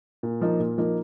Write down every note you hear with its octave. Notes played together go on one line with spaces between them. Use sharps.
A#2
F3 A#3 D#4
A#2
F3 A#3 D#4